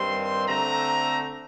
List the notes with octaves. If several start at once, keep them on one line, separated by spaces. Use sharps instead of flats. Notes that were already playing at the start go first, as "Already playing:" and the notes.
Already playing: G2 D#3 G3 C4 C6
D3 A3 C4 A#5